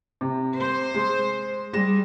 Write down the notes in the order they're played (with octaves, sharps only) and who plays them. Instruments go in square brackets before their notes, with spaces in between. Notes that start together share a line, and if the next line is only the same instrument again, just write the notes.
[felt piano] C3
[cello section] C5
[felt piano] G#3
[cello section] G3 [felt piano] G#3 A#6 E7